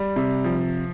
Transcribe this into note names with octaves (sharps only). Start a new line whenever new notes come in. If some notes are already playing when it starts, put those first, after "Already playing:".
Already playing: G3
C3
F3